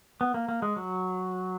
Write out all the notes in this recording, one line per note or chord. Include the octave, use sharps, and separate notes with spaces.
B3
A#3
A#3
G#3
F#3